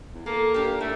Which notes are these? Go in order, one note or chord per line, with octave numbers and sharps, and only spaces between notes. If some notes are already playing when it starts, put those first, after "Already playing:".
E2
A#3 A4
A#3 D4 G4
A3 E4